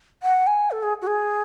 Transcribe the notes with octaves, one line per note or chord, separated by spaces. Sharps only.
F#5
G#5
A4
G#4
F#4
G#4